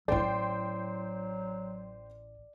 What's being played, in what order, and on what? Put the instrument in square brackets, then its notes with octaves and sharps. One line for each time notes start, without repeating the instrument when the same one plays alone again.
[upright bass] A1 E4 [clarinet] F#3 [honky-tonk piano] C5 G5 C6 [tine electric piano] D5